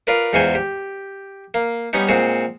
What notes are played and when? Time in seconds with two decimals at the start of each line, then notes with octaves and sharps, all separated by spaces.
0.07 F4 A#4 B4 D5
0.33 E2 G#2 F4 F#4 G5 G#5
0.55 G4
1.54 A#3
1.93 G3 B3 C#4 D#4
2.09 A#2 G#3 C4 F#4